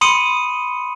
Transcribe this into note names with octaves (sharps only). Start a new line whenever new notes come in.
B5 C6 D#6 C#7 D#7